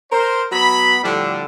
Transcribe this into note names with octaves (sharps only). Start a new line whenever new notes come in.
A#4 C5
F#3 B3 B5
A2 D3 F3 G3 D4